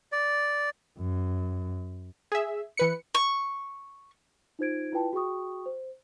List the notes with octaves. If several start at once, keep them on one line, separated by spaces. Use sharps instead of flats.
D5
F#2
G#4 E5
E3 B4 C#7
C#6
D#4 F4 C5 G#6 D7
E4 F4 B4 G5 A5
F#4 G#4 G5 C#6 D#6
C5